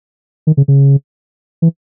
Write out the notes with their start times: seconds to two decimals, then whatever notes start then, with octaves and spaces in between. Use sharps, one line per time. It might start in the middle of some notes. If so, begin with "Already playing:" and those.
0.47 D#3
0.57 C#3
0.68 C#3
1.62 E3